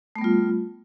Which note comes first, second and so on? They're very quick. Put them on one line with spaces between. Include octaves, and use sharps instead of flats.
A3 B3 G3 F4